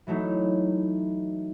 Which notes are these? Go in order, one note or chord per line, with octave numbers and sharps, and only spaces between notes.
E3 F#3 A3 D#4